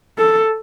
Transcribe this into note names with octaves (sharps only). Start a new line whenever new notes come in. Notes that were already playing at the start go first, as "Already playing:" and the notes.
A4